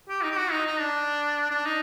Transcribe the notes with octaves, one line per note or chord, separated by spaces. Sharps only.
G4
D#4
G4
F#4
D#4
D#4
D4
D4
D#4